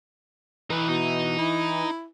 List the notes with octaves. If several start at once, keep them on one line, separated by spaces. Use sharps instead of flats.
E3 D#4 B4
B2 D#4
E4